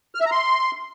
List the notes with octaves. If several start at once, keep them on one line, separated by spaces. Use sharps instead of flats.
F6
E5
A#5
C6